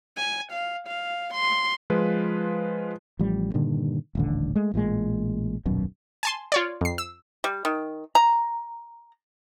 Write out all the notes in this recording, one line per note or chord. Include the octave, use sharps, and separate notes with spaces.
G#5
F5
F5
C6
F3 G#3 F4 B4
A1 F3 G3
G2 A#2 D3 D#3
D#1 A1 D3
G#3 A3
A1 A#2 C#3 G#3
D#1 B1 F#2 B2
G#5 A5 C6
F4 C#5 D5
F2 C7
E6
G3
D#3
A#5